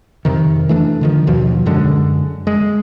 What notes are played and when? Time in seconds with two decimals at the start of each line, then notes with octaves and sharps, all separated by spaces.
0.25 F2 C3 D#3
0.69 E3 A3 A#3 D4
1.01 D3 D#3 F3
1.27 D#2 B2 F3 F#3
1.66 F#2 D3 G#3
2.47 G#3